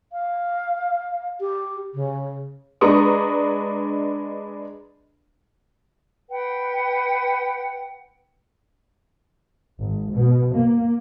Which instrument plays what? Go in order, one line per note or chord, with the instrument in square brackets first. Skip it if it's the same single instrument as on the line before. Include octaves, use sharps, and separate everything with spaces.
[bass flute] F5
G4
C#3
[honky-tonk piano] G#3 D4 B4 A#5 C#6 D#6
[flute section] B4 F#5 G5
[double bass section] G#1
B2
A#3